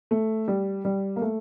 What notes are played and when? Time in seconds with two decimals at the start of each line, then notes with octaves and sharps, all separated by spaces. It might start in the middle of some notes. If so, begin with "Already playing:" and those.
0.11 A3
0.48 G3
0.85 G3
1.16 A#3
1.22 A3